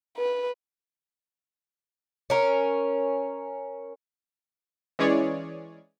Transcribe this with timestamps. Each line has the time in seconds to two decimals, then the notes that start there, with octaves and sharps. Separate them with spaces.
0.17 B4
2.30 C#4 A#4
4.99 E3 G#3 C#4 G#4 C#5 D5